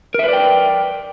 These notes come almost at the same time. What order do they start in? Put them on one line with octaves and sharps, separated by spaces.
A#4 E5 B4 D5 G5